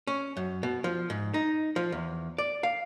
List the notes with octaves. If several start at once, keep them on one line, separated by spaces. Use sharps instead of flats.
C#4
F#2
B2
F3
G#2
D#4
F3
E2
D5
F5